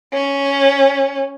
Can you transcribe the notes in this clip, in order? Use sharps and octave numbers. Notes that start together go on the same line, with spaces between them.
C#4